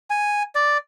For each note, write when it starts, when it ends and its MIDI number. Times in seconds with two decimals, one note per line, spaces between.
0.10 0.43 80
0.55 0.78 74